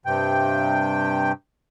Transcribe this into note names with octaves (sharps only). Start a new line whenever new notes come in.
G2 C3 G5